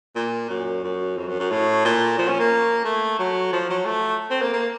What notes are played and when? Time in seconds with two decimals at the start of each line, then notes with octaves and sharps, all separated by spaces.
0.16 A#2
0.50 F#2
0.84 F#2
1.17 F2
1.28 F#2
1.40 F#2
1.51 A2
1.85 A#2
2.19 F3
2.29 C#4
2.40 A#3
2.85 A3
3.19 F#3
3.53 F3
3.70 F#3
3.86 A3
4.31 C4
4.42 A#3
4.53 A#3